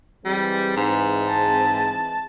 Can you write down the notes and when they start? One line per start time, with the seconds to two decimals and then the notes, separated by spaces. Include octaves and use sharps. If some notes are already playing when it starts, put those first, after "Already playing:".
0.25 E3 G3 G#3 C4
0.76 G#2
1.28 A5